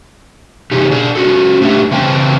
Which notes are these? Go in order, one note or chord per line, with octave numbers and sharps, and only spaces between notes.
C3 E3 D#4 G4 G#4
D4 G#4
C#4 F#4 A4
A2 A3 D4 G4 E5
C#3 E3 C4 B4 G5 A5